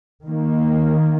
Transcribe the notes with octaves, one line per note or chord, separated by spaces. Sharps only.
D#3
A#3